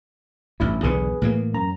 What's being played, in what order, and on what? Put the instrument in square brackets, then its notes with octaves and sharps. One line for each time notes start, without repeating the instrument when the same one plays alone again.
[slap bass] A1 G2 [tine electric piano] E4
[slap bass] B1 E2 D3 [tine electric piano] G#4 B4
[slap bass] A2 E3 A#3
[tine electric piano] F#2 A#5